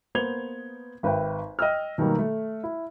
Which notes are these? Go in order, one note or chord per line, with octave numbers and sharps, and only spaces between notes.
A#3 B3 C5 G#6 F7 G7
G#1 B4 E5 G5
D#5 G5 E6 F6
B2 D#3 F#3 G3 A#3
A3
E4